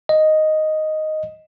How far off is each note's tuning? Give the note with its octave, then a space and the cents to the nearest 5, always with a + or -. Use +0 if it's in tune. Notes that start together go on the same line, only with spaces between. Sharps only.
D#5 +0